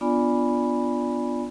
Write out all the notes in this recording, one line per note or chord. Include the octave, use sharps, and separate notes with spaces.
B3 D4 F4 D5 G#5 B5